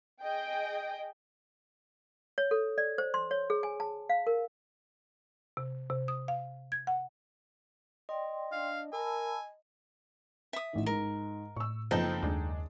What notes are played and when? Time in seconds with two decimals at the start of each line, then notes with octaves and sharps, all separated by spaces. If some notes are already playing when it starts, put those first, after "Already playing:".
0.22 G#4 D#5 G5
2.38 C#5
2.51 A4
2.78 D5
2.98 C5
3.14 C6
3.31 C#5
3.50 G#4
3.63 G#5
3.80 A5
4.09 F5
4.27 A#4
5.57 C3
5.90 C3
6.08 D#6
6.28 F5
6.72 G#6
6.87 F#5
8.09 D5 D#5 G5 C6
8.52 D4 F5
8.93 A#4 G#5 A5 B5 E6
10.53 E5 D#6
10.73 A1 D#3
10.86 G#2 A#4
11.56 A2 C#6 E6
11.91 F#1 F3 B3 C4 D#4 A4 D#5 G5
12.23 D#2 G#3 D4